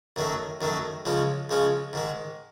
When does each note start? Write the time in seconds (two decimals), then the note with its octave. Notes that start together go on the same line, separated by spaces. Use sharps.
0.16 F#2 D#3 F#3 A3
0.61 F#2 D#3 F#3 A3
1.05 C#2 C#3 F3 G#3 C#4
1.49 C#2 C#3 F3 G#3 C#4
1.93 G#2 D#3 G#3